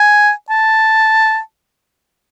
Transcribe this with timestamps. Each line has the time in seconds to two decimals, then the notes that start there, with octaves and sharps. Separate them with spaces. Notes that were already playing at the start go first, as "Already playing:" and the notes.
Already playing: G#5
0.50 A5